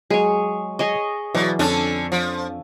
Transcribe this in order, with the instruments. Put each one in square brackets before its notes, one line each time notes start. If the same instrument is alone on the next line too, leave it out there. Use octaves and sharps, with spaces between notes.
[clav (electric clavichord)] F#3 G#3 [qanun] G#4 C#5
[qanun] G#4 C#5 D#5
[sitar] B2 [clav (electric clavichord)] E3 F#3 D5
[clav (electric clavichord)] F2 [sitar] D3 C#4 D4 [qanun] A4
[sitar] F3